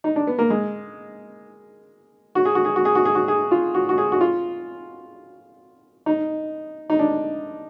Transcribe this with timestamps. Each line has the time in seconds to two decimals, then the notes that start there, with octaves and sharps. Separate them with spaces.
0.04 D#4
0.16 D4
0.27 B3
0.39 A#3
0.50 G#3
2.35 F#4
2.45 G#4
2.55 F#4
2.65 G#4
2.76 F#4
2.85 G#4
2.95 F#4
3.05 G#4
3.15 F#4
3.28 G#4
3.51 F4
3.74 F#4
3.89 F#4
3.98 G#4
4.12 F#4
4.21 F4
6.06 D#4
6.90 D#4
6.99 D4